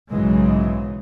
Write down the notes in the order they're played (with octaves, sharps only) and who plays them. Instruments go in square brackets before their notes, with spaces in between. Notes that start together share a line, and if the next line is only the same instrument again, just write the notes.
[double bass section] B1 G#2 C#3 E3 F#3 G#3